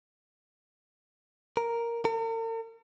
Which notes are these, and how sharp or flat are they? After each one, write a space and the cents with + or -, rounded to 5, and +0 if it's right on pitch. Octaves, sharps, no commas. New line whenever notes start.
A#4 +0
A#4 -45